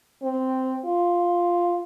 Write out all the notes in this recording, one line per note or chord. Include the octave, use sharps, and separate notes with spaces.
C4
F4